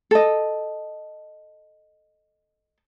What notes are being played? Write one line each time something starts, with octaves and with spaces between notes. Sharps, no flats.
A4 D#5